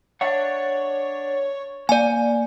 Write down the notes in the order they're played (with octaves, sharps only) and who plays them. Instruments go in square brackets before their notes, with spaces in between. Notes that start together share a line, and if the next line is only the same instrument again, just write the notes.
[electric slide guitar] D4 E5 F#5 [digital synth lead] C#5
[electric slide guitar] A#3 [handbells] D5 G#5